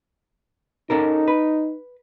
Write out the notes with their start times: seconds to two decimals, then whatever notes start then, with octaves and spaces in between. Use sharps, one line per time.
0.90 C#4 D#4 A4 A#4
1.28 B4